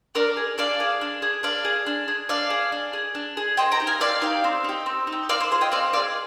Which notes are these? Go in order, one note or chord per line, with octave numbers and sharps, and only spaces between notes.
D4 A#4 D5
G#4
D4 D5 F5
G#4
D4
G#4
D4 D5 F5
G#4
D4
G#4
D4 D5 F5
G#4
D4
G#4
D4
G#4
C4 D#5 G5
G5 A#5
D#4 G4
F5 G#5
C4 D5 F5
D#4 G4
C4
D#4 G4
C4
D#4
G4
C4 D5 F5
C5
F4 G#4 C5
D#5 G5
C4 D5 F5
F4 G#4 D5 F5